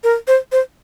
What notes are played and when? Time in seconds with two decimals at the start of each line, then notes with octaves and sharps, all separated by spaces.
0.04 A#4
0.28 C5
0.52 C5